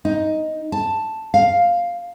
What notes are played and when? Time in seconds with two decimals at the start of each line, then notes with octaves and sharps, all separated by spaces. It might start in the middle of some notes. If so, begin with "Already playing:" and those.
0.05 D#4
0.72 A5
1.34 F5